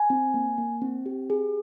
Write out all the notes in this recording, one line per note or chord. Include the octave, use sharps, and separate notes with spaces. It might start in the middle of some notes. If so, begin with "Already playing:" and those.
Already playing: G#5
C4
A#3
A#3
C4
G4
G#4